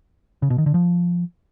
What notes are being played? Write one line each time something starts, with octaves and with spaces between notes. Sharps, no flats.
C#3
B2
D#3
D3
F3